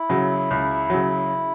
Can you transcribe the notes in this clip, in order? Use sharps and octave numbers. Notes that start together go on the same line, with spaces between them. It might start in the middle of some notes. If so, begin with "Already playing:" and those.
Already playing: E4
C#3 F#3
C#2
C#3 F#3